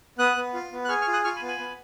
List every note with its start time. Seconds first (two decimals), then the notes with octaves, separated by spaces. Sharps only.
0.19 B3 D#6 F#6
0.37 B3
0.54 F4
0.72 B3
0.85 F#6
0.89 G#4 C#6 F6
1.01 C#6 F6
1.07 F4
1.13 D#6 F#6
1.24 F4 C#6 F6
1.36 G#5 B5
1.42 B3
1.48 G#5 B5
1.59 B3